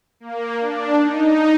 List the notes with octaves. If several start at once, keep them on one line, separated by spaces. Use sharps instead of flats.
A#3
D4
D#4